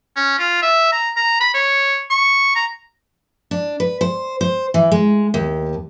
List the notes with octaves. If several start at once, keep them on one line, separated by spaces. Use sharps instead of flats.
C#4
F4
E5
A#5
A#5
B5
C#5
C#6
A#5
D4
B4
C5
C5
E3
G#3
D#2